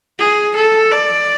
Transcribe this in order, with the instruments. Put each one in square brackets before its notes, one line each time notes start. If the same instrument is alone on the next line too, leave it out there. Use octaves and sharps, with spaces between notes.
[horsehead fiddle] G#4
A4
D5